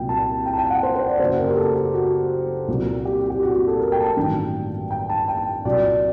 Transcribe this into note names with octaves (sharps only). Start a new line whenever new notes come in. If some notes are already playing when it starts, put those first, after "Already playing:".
Already playing: C2 A#2 F#3 G5
A5
G5
A5
G5
F#5
C5
C5
D5
F#1 F#2 F#3 C5
A#4
G4
A4
G4
F#4
C2 A#2 F#3
G4
G4
F#4
F#4
A4
A#4
G5
A5
G5
A1 G2 D#3 F#3
G5
A5
G5
C2 A#2 F#3 D5